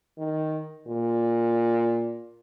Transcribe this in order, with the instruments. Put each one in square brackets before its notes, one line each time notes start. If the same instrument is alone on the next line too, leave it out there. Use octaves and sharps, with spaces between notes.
[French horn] D#3
A#2